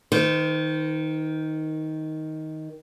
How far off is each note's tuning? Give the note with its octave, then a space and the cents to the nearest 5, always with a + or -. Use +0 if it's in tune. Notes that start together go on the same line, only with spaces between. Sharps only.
D#3 +10 C5 -40